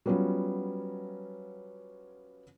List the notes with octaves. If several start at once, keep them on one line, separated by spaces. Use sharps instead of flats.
F#3 G3 B3 C#4 F4